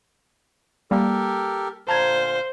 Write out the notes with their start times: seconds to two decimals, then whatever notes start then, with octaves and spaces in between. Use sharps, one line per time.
0.91 G3 A#3 G4 A4 A#4
1.89 A#2 D3 C5 F5 A5 A#5 G#6